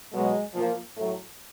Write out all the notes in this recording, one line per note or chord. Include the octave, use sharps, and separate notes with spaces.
B2 F#3 G#3
A#2 F3
A2 F#3 A3